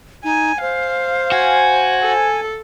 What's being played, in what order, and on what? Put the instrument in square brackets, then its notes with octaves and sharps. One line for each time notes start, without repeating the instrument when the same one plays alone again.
[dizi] D#4 [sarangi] G#5
[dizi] C5 [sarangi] F5
[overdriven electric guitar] F#4 [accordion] G#5
[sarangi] A4